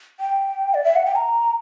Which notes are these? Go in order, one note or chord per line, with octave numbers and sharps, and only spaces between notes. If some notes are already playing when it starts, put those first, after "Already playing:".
G5
D5
E5
F#5
G5
A#5